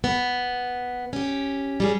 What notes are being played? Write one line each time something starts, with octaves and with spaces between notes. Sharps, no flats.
B3
C#4 G4
G3 C#4 G#4